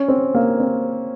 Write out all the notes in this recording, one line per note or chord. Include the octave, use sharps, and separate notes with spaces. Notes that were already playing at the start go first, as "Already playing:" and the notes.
Already playing: C#4
C4
A#3
C4